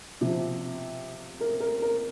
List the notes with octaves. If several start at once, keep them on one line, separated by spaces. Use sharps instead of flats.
C3 F3
A#4
A#4
A#4